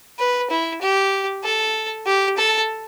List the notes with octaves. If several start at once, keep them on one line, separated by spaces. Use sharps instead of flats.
B4
E4
G4
A4
G4
A4